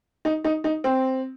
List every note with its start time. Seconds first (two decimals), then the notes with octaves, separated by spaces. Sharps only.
0.25 D#4
0.44 D#4
0.64 D#4
0.84 C4